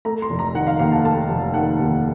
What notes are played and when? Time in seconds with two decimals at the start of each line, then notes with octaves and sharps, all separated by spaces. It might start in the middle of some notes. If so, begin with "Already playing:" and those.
0.05 A3 A#5
0.22 C6
0.30 F1
0.39 A#5
0.54 D#3 F#5
0.67 F5
0.79 D#2 F5
0.92 A5
1.04 A3 A5
1.29 F1
1.54 D#3 F#5
1.80 D#2